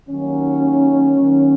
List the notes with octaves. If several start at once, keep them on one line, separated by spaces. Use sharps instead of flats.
D#2 D#3 F#3 C#4
D#2 D#3 F#3